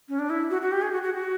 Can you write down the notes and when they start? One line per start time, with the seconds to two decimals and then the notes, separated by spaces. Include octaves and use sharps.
0.09 C#4
0.19 D4
0.30 E4
0.50 F#4
0.61 F#4
0.72 G4
0.82 G#4
0.92 F#4
1.03 F#4
1.14 F#4